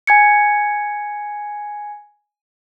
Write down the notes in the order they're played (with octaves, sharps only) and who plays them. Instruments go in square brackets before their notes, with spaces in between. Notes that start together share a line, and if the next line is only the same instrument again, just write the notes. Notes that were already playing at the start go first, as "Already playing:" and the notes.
[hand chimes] G#5 G#6 C#7